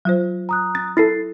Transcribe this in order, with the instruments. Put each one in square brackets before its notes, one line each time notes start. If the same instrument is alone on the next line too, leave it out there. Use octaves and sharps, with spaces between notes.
[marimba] F#3 F4 C5
[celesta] A#5 D#6 F#6
[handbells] A6
[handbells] E4 A4 [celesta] A6 C7